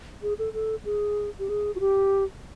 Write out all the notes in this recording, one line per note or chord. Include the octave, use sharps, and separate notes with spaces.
G#4
A4
A4
G#4
G4
G#4
F#4
G4